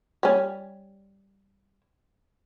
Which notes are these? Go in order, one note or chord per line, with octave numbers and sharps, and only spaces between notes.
G3 C#4